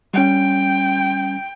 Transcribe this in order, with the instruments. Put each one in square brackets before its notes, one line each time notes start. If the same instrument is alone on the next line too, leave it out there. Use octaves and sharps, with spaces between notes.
[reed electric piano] G3 C#4 [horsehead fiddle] G5